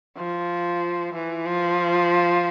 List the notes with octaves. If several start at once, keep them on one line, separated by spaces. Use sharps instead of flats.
F3
E3
F3